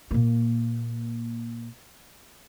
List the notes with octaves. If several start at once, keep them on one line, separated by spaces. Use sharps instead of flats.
A#2 A#3